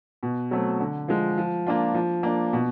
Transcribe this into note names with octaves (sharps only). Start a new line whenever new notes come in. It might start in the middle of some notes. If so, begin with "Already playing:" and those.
B2
F#3 A3 C4
D3
F3 G#3
F3
A#3 D4 F4
F3
A#3 D4
B2